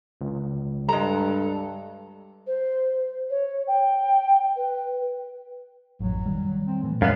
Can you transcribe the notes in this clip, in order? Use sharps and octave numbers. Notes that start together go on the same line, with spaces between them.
C#2
G2 G3 G#3 A4 A#5
C5
C#5
G5
B4
A1 F2 F#3
D#3 G3
C4
A#2 E3 A3
F#2 G#3 B3 F5